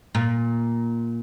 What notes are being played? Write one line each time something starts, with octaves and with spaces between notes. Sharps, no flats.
A#2